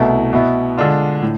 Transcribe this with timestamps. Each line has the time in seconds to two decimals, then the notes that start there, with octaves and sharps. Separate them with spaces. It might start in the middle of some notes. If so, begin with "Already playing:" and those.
Already playing: C2 B2 A3 E4
0.33 B2 B3 E4
0.78 D3 G#3 D4 F4
1.22 A2